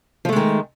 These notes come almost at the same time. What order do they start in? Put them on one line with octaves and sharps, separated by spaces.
F3 A3 G#3 D#3